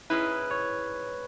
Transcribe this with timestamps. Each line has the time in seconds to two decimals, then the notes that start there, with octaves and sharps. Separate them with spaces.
0.10 G#2 G#3 C#4 E4 B4
0.51 C#5